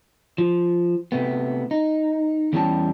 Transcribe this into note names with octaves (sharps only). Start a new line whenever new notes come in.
F3
C3 A3 B3
D#4
E2 E3 G3 C#4 G4 A5